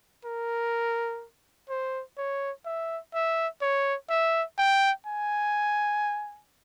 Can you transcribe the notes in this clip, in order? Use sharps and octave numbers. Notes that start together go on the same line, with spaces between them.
A#4
C5
C#5
E5
E5
C#5
E5
G5
G#5